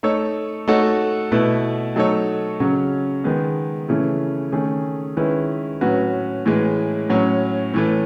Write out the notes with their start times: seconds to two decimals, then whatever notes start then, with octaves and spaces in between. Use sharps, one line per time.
0.03 A3 D#4 A4 C#5
0.68 A3 D#4 F#4 A4 C#5
1.32 B2 A3 E4 B4
1.96 F#3 A3 D#4 A4 C#5
2.60 C#3 F#3 C#4
3.24 D#3 G#3 B3
3.88 C#3 E3 A3 C#4 E4
4.52 D#3 A3 C#4 G#4
5.17 D#3 G#3 C#4 E4 B4
5.81 A2 F#3 C#4 F#4 B4
6.46 A2 E3 G#3
7.09 A2 F#3 C#4
7.74 A2 E3 A3